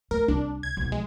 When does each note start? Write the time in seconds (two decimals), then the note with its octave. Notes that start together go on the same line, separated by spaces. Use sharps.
0.11 A3 A#4
0.28 C2 D4
0.63 G#6
0.77 B1 F3
0.92 G#3